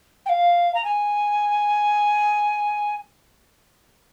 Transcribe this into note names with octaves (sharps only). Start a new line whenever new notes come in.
G5
F5
A#5
G#5